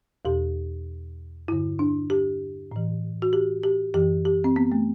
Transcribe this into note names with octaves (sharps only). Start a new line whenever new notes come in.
E2 B2 G4
G2 D3 E4
D4
G4
A2 E3
F#4
G4
G4
F#2 E3 G4
G4
C4
B3
A3